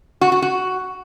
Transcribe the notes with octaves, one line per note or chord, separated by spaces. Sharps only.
F#4
F#4
F#4